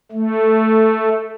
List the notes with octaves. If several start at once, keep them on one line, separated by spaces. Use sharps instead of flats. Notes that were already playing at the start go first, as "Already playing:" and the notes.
A3